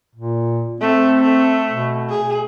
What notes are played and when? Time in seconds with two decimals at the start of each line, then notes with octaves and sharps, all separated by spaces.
0.15 A#2
0.81 A3 C4
1.23 A3
1.70 B2
2.10 G#4